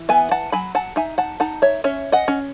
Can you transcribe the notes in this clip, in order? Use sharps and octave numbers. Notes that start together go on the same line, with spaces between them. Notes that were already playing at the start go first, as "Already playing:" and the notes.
Already playing: E3
B3 E5 G#5
F#5 A5
F#3 G#5 B5
F#5 A5
D#4 E5 G#5
F#5 A5
D#4 F#5 A5
C#5 E5
C#4 C#5 E5
D#5 F#5
C#4